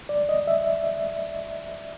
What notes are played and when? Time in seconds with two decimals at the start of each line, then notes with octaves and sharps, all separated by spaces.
0.09 D5
0.29 D#5
0.47 E5